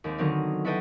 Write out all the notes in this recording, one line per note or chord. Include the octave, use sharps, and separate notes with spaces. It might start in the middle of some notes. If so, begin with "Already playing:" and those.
D#2 G#3 C4
D3 D#3 F#3 B3 C4 D#4
E4 F#4 A4 B4 D#5 G5